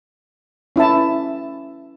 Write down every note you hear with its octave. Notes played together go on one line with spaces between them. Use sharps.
C#4 E4 E5 A5